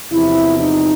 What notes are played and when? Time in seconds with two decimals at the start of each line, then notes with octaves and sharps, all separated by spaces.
0.11 E2 C3 F3 E4
0.59 D#4